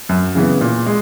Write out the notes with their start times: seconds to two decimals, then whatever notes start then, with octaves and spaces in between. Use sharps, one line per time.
0.09 F#2
0.35 C#3 E3 B3
0.61 A#2
0.87 G#3